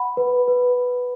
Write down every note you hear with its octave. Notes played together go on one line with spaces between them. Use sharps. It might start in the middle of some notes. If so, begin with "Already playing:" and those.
Already playing: F#5 B5
B4
B4